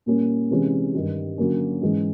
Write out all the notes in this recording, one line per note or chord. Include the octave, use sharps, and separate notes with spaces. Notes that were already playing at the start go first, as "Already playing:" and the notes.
A#2 G3 A#3 C#4
C3 E3 G#3 C#4
G2 D#3 G3
D3 F#3 A#3 C#4
G#2 E3 G#3 C#4